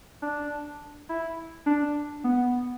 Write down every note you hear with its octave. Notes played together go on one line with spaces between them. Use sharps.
D4
E4
D4
B3